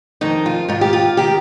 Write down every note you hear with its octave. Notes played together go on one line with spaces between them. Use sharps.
F2 D#3 D#4
F4
G#2 D#3 F4
G4
F4
D#3 G4